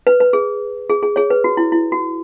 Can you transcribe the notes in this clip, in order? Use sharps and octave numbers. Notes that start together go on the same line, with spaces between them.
B4
B4
G#4
G#4
G#4
G#4 C#5
B4
F#4
E4
E4
F#4